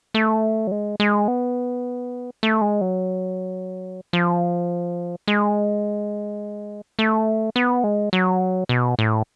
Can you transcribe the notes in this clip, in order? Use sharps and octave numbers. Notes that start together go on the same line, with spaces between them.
A3
F#3
G#3
G#3
B3
A3
G#3
F#3
F3
G#3
A3
B3
G#3
F#3
B2
A2